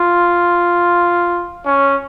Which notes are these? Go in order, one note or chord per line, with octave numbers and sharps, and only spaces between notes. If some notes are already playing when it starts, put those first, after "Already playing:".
Already playing: F4
C#4